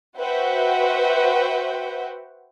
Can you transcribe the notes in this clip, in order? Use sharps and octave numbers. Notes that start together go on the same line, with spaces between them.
F#4 B4 C5 E5 F#5 G5